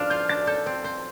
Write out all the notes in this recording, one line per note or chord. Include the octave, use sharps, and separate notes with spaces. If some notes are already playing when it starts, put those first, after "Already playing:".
Already playing: F3 D4 F5 F6
F4 G6
D4 A6
A4 G6
C4
C5